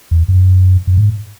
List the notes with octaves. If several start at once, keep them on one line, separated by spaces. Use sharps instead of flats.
E2
F#2
F#2
G#2